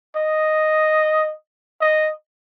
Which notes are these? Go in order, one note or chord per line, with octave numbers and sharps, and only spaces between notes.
D#5
D#5